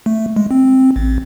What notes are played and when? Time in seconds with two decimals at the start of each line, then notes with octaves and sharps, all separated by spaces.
0.06 A3
0.36 G#3
0.51 C4
0.96 A1